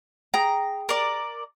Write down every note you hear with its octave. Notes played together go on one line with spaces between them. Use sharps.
G#4 G5 A#5
A#4 D5